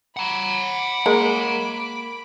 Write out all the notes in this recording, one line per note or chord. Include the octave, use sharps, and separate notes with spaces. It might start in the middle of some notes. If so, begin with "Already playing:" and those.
F#5 A#5 B5 D6
G#3 A#3 A#4